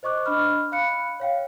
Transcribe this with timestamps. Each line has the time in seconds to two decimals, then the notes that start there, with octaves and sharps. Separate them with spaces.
0.03 C5 D#5 C#6 D6 F#6
0.26 D4 D#5 B5 F6
0.72 F5 B5 F#6 C#7
1.20 C#5 F5 G5